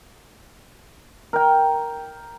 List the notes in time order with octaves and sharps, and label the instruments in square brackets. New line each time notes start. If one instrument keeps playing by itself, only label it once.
[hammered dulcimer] A#4 G5